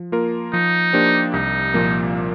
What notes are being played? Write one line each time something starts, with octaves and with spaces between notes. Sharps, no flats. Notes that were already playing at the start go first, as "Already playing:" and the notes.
Already playing: F3
A#3 F4 A#4
F3 D#4
A#3 D4 G4 C5
C2 D#4
A#2 F3 A#3